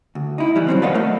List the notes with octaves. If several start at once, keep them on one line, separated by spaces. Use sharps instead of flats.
D2
D#4 E4
E3 G3
D#2 F#3 C4
B4 D5 D#5 F5 F#5
A3 A#4